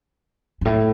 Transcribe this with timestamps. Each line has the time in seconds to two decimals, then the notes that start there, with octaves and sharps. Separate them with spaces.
0.61 G2
0.65 A2